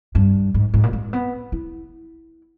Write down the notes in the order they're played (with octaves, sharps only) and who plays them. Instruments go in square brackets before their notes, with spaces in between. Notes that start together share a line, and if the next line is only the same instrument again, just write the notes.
[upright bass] G2
G#2
G#2
A#2
G#3
B3
E4